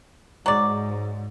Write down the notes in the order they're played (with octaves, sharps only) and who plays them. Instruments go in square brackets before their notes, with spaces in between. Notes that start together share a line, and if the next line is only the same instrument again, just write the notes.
[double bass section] G#2 [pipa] F#3 D5